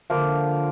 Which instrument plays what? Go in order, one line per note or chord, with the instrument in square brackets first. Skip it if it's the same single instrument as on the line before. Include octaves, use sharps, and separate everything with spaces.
[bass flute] D3 [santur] F3 A#3 F4